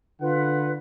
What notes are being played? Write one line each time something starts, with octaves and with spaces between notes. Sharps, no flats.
D3 F4 B4 F#5